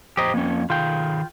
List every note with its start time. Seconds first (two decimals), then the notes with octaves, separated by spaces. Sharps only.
0.17 F2 G4 C5 D#5 A#5
0.34 F2 A#3 C#4
0.70 D#3 F4 G#4 F5 G5